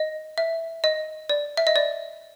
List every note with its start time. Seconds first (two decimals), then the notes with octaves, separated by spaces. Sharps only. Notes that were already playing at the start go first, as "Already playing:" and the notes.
Already playing: D#5
0.38 E5
0.84 D#5
1.30 D5
1.57 E5
1.67 D#5
1.76 D5